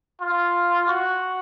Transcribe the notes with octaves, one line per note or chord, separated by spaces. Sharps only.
F4
F#4